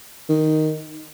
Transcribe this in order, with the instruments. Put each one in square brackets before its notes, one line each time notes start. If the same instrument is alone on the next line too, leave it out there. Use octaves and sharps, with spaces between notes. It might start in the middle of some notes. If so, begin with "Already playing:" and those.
[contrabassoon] D#3